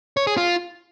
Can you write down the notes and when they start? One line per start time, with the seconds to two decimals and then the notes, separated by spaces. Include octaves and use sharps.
0.17 C#5
0.27 G#4
0.37 F4